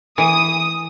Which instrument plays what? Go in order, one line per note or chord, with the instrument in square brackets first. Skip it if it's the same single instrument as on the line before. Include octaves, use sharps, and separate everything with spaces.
[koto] E3 [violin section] D#6